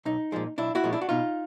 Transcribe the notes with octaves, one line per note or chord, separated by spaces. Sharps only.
B1 D#4
A#2 F3 G#3
B1 D4 E4
E4 F#4
A#2 F3 G#3
D4 E4
F#4
B2 D#4 F4